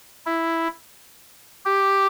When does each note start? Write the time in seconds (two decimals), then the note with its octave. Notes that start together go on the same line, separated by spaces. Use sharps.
0.26 E4
1.65 G4